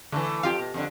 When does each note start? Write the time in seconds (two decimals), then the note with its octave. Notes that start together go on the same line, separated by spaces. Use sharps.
0.12 D3 E3 A3
0.43 F2 F4 G4 F5
0.59 B2
0.74 F2 D3